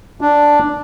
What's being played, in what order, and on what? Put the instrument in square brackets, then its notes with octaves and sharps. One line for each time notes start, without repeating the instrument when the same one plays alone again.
[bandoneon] D4